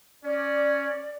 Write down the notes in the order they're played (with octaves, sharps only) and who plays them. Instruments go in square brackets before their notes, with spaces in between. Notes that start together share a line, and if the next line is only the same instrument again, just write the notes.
[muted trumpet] C#4 [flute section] D5